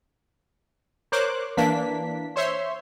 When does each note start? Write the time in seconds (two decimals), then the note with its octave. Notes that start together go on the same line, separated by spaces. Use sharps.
1.12 A#4 C5 C#5 D6 F#6
1.57 E3 A#3 D4 B6
2.36 C5 C#5 E5 C6